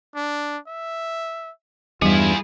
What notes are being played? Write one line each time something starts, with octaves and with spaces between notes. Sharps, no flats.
D4
E5
E2 G2 G3 E4 F4 G#4